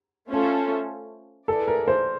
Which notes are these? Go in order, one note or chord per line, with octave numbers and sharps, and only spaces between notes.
A3 C#4 F4 A4 C5
E4 G#4 A4 B4 D5
A#4
C5